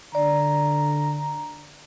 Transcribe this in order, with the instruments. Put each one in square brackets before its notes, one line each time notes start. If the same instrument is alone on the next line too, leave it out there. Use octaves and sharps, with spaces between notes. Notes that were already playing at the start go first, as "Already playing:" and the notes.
[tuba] D3 [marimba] D5 [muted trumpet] A#5